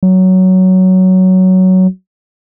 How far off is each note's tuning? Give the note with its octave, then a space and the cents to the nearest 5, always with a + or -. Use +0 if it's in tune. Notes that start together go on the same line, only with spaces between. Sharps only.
F#3 +10